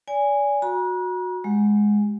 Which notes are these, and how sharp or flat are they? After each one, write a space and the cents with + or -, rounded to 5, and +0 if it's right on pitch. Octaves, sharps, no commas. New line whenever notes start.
D5 -35 G#5 -10
F#4 -20 A#5 +45
G#3 +0 G4 -20 F#5 +0